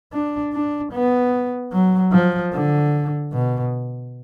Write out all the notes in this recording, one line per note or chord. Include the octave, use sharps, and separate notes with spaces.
D4
D4
B3
F#3
F3
D3
B2